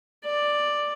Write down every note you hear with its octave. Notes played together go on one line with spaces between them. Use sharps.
D5